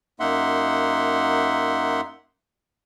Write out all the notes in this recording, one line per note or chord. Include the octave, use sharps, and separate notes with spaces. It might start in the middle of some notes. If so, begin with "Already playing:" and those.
F#2 A#3 D#4 E5 F#5 C6